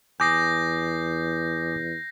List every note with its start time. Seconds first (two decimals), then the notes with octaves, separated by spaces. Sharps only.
0.20 E2 G#5 D6 D#6 G6 A#6 C7